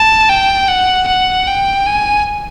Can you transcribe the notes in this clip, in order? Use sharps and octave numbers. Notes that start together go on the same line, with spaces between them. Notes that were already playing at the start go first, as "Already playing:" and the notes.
Already playing: A5
G5
F#5
F#5
G5
G#5